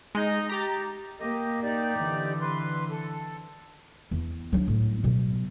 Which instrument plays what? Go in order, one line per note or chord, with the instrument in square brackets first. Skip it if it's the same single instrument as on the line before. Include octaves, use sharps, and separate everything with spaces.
[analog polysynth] G#3 [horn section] D#4
[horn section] G4 [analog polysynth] A#5 A6
[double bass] A#3 [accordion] G4 D#5
[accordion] D#4 G4 D5
[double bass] D3 E3
[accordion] B4 C6
A4
[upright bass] E2
F#3 D4
A2
B2 F#3